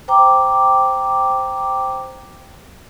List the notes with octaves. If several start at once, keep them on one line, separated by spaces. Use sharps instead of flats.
C5 G5 A#5 D6